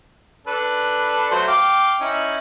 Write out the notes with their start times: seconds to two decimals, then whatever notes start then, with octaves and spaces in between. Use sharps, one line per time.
0.47 D4 A4 B4
1.31 F#3 A3 C5
1.47 F5 G5 D6
2.01 C#4 D#4 E4